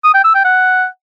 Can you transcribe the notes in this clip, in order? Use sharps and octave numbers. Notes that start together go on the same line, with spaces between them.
D#6
G5
E6
G5
F#5